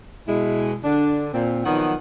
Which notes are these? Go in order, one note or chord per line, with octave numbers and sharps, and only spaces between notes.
B2 G#3 E4
D3 D4
A#2 C4
D#3 F3 F#3 B3 D#4 F#5